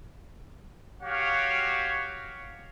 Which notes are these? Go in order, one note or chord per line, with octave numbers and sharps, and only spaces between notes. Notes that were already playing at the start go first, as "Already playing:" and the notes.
F#4 G4 C#5 F5